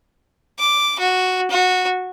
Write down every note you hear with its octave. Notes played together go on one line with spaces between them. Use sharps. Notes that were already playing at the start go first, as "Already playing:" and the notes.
D6
F#4
F#4